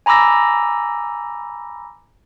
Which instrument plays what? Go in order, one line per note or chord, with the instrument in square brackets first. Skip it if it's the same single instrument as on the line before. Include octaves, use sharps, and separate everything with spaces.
[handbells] G#5 A#5 B5 D6 E6 A#6